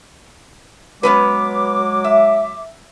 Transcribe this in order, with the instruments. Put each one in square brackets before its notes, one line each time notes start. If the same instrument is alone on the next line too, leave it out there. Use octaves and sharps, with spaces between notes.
[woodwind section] F#3 G#3 D6 [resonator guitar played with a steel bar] B3 C#4 B4
[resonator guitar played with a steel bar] E5